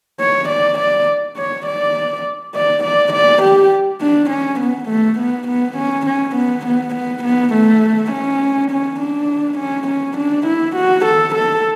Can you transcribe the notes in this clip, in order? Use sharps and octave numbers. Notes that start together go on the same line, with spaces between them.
C#5
D5
D5
C#5
D5
D5
D5
D5
G4
D4
C#4
B3
A3
B3
B3
C#4
C#4
B3
B3
B3
B3
A3
C#4
C#4
D4
C#4
C#4
D4
E4
F#4
A4
A4